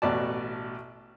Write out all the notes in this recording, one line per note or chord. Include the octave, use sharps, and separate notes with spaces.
A1 B2 D5 A5